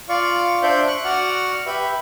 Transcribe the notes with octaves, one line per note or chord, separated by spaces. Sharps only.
F4 D5 F5 C#6
D4 C5 D5 E5 G6
C#6 F#6
F#4 D5 F#5 C#6 F6
G4 B4 E5 B5